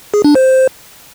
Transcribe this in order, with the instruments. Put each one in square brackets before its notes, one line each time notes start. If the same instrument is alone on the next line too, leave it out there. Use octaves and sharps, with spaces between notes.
[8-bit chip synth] G#4
D4
C5